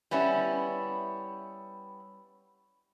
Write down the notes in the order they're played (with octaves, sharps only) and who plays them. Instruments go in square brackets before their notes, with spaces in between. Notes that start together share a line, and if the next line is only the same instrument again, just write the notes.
[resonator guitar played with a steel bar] G3 B3 C#4 E4